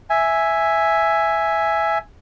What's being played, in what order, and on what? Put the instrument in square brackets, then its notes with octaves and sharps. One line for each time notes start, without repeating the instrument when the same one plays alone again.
[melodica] E5 G#5